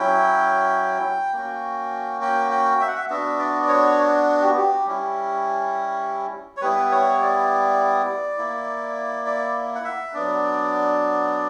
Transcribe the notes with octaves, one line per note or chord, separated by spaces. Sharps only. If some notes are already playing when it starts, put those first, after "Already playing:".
Already playing: F#3 C#4 E4 G5
A#3 C#4 F#4
G5
G5
E5
F#5
E5
B3 D4 F#4 E5
D5
D5
C#5
G4
F#4
G4
G3 C#4 E4
C#5
G3 B3 E4 B4
C#5
D5
A#3 E4
D5
F#5
E5
F#3 B3 D4 D5